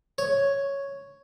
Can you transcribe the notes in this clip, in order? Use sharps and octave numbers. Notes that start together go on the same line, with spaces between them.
C#5